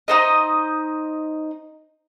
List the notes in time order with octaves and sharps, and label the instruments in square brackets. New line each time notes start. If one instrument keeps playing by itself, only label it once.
[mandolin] D#4 C5 D#5